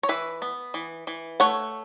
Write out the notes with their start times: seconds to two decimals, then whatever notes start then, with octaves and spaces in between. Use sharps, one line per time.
0.03 C#5
0.09 E3 B4 E5
0.42 B3
0.74 E3
1.07 E3
1.40 A3 C#5 F#5